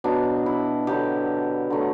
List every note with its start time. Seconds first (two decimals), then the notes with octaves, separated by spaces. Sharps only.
0.04 B2 F#3 B3 D4
0.46 E4
0.87 D3 F#3 B3 G4
1.70 D3 F#3 A3